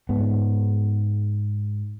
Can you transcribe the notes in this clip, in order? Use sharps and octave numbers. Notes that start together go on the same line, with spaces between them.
G#2 B3